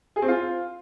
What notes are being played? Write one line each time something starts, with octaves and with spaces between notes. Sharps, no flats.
G#4
C4
F4